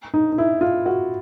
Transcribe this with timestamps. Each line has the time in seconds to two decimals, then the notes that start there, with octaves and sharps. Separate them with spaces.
0.14 D#4
0.32 D#4
0.38 E4
0.61 F4
0.86 F#4